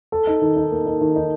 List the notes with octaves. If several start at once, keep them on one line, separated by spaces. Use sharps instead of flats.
A4
D#4
D#3
D#4
A#3
D#4
D#3
D#4